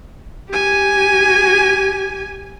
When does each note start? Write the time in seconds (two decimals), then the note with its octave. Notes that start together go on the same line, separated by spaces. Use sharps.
0.50 G4 G#5